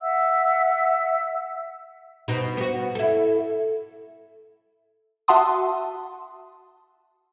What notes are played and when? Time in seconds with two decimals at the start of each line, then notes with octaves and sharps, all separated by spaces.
0.01 E5 F#5 E6
2.28 B2 D#4
2.57 B3 F#4
2.95 E4 A4
5.28 F#4 E5 F#5 A5 C6 D#6